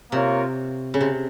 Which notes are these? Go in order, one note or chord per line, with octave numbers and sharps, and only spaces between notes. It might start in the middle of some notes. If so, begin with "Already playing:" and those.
C3 A#3 F4 A#4 C#5
C#3
C3